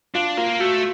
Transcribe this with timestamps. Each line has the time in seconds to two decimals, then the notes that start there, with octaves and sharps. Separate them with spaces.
0.15 D4 F4
0.37 A#3 F4
0.60 A3 F#4